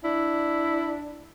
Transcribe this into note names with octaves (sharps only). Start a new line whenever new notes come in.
D4 E4